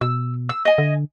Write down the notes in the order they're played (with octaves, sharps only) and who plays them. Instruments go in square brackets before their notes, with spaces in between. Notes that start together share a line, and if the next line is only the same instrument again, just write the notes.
[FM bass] B2 [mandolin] E6
[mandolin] E6
D#5 G#5
[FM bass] D3